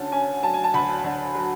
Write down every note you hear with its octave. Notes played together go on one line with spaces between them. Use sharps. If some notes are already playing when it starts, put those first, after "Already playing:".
Already playing: D2 D3 C#4 A5
C#4 G#5
F#3 A5
G#5
A5
D2 B5
D3
F#3